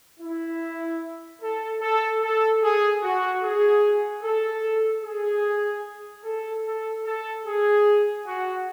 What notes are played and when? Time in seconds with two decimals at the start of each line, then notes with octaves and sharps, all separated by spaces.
0.20 E4
1.42 A4
1.82 A4
2.22 A4
2.62 G#4
3.03 F#4
3.43 G#4
4.23 A4
5.04 G#4
6.24 A4
6.65 A4
7.05 A4
7.46 G#4
8.26 F#4